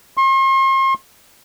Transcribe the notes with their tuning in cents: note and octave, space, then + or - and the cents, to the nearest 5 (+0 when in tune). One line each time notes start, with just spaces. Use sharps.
C6 +45